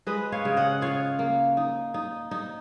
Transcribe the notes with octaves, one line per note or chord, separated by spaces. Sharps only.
G#3 B4 D#5
C#5 F5
C#3
D#5 F#5
F4 C#5 F5
A#3
D#4
D#4
D#4